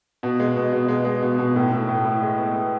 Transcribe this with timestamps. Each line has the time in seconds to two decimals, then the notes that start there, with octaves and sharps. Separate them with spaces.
0.23 B2
0.40 G#3
0.56 B2
0.72 B2
0.88 G#3
1.05 G#3
1.22 B2
1.38 B2
1.56 A2
1.72 A2
1.89 A2
2.05 E4
2.22 G#3
2.38 B3
2.54 B3